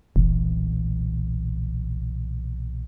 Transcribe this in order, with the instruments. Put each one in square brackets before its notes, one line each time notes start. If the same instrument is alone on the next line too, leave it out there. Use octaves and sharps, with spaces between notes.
[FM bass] F1 [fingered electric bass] B1 A#2 E3